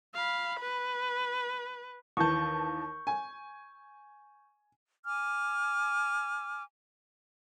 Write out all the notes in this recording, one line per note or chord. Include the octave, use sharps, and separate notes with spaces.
F5 B5
B4
D#2 E3 A5 C#6 G6
G#5
G#5 D6 F6